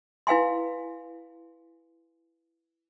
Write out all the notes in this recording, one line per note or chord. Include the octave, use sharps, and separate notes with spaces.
E4 B4 F5 G#5 C6